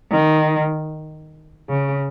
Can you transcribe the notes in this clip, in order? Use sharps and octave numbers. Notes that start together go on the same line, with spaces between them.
D#3
C#3